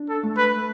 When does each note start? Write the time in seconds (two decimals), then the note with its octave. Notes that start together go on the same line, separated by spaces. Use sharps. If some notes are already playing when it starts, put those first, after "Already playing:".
Already playing: D4
0.09 A4
0.23 A3
0.37 B4